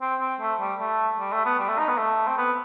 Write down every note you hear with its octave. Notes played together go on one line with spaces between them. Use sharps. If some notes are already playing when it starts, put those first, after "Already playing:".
C4
C4
A3
G3
A3
G3
A3
B3
G3
A3
D#4
B3
A3
C4
B3